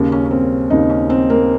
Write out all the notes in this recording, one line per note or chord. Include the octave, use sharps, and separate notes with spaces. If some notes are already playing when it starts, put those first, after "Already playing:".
Already playing: D#2 C#3
C#4
C#4
C4
D#2 C#3 D#4
C#4
C4
A#3